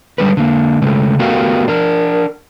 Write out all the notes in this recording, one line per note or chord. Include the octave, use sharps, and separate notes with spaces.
D3 G3 G#3 B4
D3 A#3
C#3 G#3 A3
A3 B3 F#4 G4 A#4 F5
D4 A#4